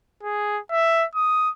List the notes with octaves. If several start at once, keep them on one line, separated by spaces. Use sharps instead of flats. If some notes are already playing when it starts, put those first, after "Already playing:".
G#4
E5
D#6